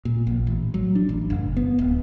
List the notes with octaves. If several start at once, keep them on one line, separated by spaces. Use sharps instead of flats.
A#2
A#1
A1
F#3
D4
A1
F#1
B3
D1